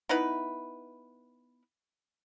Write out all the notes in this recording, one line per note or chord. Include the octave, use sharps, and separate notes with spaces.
B3 D#4 E4 B4